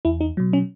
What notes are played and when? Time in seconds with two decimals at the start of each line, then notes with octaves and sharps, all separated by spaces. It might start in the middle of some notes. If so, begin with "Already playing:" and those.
0.05 E2 E4
0.21 D#4
0.37 B2 F#3
0.53 C#4